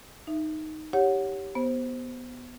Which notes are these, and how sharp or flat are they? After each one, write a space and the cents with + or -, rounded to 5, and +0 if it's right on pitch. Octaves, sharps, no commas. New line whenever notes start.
D#4 +0 E5 +15
G4 +0 C#5 +0 F#5 -5
B3 +0 C5 +0